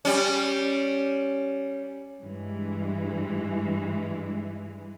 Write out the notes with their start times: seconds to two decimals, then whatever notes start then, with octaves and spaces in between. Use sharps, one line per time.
0.05 G3 C#4
2.22 G2 E3 G#3